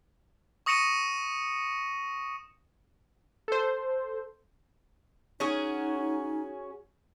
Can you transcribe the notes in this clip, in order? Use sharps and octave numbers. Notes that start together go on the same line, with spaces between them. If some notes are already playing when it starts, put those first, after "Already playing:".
C#6 D#6 A#6 C#7 D#7 E7
A4 C5
C#4 D#4 F#4 G#4